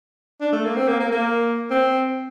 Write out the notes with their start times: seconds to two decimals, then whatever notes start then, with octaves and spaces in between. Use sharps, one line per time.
0.41 D4
0.53 A3
0.65 A#3
0.76 C4
0.88 A#3
1.00 A#3
1.12 A#3
1.71 C4